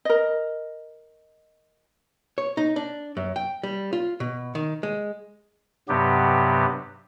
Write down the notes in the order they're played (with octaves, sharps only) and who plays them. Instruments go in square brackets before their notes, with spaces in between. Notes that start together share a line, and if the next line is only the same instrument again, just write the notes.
[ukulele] A#4 D#5
[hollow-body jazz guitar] C#5
D#4
D4
F#2
G5
G3
F4
B2
D#3
G#3
[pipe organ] G2 C3 F#3 B3 G4